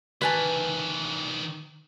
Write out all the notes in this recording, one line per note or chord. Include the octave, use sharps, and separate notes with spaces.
D#3 E3 B4 G#5 A5